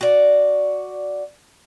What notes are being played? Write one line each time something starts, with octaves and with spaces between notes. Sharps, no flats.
F#4 D5